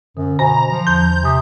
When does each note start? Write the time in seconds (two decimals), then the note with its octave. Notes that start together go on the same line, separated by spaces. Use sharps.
0.17 F#2 D3
0.39 B2 C5 G#5 A#5
0.70 F3
0.87 E2 C6 G6
1.23 C3 G#5 D#6